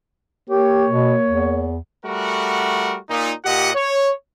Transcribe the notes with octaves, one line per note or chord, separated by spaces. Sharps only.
A#3 G4 C#5
B2
E2
G3 A3 F#4 A#4 F#5
A#2 D#4
A#2 G4 D#5 F#5
C#5